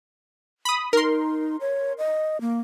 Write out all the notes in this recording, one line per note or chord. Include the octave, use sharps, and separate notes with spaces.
B5 D#6
D#4 A#4 C6
C#5
D#5
A#3